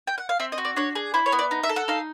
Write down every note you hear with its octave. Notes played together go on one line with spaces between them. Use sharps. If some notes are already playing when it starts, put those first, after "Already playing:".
G5
F#5
F5
C4 E5
D#5
F#4
D5
D4 C#5
G#4
E4 C5
C#5
B3
D5
D#4
E5
A4
F#5
D#4 F5